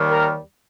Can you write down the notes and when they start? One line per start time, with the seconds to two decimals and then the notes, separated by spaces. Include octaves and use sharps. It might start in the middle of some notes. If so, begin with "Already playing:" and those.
Already playing: D#2 D#3 G3
0.09 A#4